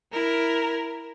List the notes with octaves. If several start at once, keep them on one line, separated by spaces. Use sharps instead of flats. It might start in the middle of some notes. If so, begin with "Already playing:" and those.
E4 A#4